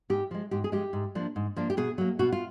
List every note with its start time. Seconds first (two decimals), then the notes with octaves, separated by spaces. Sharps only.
0.10 G#2 G4
0.31 F3 G#3
0.51 G#2 G4
0.64 G#4
0.72 F3 G#3 G4
0.93 G#2
1.15 F3 A#3 D4
1.36 G#2
1.56 F3 A#3 D4
1.70 G4
1.77 B2 G#4
1.98 F#3 A#3
2.19 B2 F#4
2.32 F4